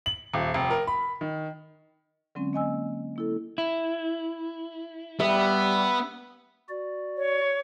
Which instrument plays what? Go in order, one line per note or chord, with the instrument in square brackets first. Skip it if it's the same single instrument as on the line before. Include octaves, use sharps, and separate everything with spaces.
[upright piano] F#7
D#1
F1
A#4
B5
D#3
[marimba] D3 F#3 G#3 C4 C#4
A#3 D#5 G#5 E6
A#3 E4 A4
[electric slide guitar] E4
[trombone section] G3 [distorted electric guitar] B3 [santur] E5
[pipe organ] F#4 D5
[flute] C#5